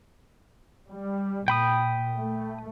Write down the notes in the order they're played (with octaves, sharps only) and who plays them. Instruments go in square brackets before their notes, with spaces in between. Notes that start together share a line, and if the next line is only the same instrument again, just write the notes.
[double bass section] G3
[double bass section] A#2 [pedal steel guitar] G5 B5 D#6
[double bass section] A3